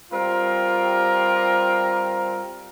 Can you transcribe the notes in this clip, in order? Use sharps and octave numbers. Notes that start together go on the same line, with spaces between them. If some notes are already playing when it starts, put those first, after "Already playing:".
G3 C4 F4 A#4